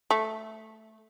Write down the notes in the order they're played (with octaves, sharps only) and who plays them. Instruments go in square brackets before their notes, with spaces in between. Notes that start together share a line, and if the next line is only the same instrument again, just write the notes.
[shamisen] A3